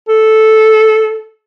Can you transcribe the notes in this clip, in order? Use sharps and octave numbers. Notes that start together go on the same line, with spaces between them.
A4